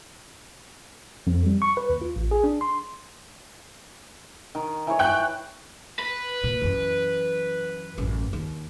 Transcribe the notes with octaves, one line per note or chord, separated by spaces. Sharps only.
F2
G3
C#6
B4
D#2
F4
A1
G#4
D4
C6
D#3
E3 C#5
G5 F#6
B4
A#2
F#2 E3
A1 F#2
D#2